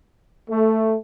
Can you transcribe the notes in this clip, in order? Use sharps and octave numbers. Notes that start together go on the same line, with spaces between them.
A3